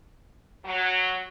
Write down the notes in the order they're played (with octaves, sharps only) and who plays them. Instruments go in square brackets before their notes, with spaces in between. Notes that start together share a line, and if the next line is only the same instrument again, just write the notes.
[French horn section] F#3